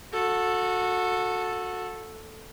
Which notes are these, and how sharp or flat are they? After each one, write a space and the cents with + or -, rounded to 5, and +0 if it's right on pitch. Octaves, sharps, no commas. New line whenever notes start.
F#4 -25 A4 +0